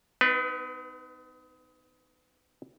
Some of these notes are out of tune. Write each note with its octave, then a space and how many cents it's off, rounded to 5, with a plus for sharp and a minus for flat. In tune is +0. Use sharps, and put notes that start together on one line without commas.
B3 +40 D#4 +0 B4 +0